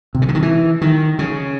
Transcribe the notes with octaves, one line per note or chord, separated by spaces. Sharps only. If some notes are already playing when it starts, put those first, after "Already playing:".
C3
C#3
D3
D#3
E3
D#3
C#3